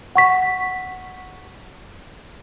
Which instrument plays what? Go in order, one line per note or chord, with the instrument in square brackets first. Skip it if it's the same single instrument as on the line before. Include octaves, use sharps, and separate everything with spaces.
[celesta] F#5 C#6 B6